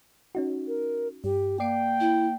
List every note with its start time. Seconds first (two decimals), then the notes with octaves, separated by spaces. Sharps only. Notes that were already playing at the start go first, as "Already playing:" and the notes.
0.35 C#4 D#4 F#4
0.68 A#4
1.24 G2 G4
1.60 A#3 D5 G5 C7 D7
2.00 E4